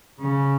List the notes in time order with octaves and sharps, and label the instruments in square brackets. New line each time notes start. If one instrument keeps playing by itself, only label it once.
[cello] C#3